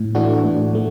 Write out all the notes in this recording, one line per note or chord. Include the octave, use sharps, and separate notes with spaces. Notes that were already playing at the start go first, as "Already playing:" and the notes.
Already playing: A2
E3 A3 D4 F#4
A2
F3 A3